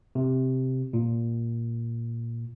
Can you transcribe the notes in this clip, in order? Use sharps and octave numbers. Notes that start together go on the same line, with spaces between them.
C3
A#2